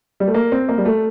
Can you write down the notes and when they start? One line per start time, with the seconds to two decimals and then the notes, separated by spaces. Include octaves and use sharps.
0.20 G3
0.27 A3
0.34 A#3
0.52 C4
0.69 A#3
0.78 G3
0.85 A3